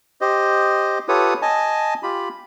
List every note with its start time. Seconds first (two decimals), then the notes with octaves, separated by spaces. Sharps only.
0.21 G4 C5 D#5
1.08 F4 G4 A4 B4 C#5 D#6
1.42 D#5 G#5 A5
2.03 F4 G4 B5